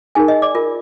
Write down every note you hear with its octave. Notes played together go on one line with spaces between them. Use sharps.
D#4 G#4 A#4 G#5
D#5
D5 D6
F4 A#4